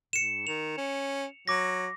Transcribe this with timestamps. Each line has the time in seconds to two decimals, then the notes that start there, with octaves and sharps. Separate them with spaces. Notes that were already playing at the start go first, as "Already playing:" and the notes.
0.13 G#2 C#7 E7
0.47 D#3 F7
0.77 C#4
1.48 F#3 D6 A#6